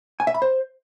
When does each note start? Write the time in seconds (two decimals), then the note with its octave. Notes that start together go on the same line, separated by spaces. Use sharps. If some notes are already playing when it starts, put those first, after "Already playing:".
0.20 G#5
0.27 E5
0.34 B5
0.42 C5